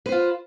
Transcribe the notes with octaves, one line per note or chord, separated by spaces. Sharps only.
F4 B4 C5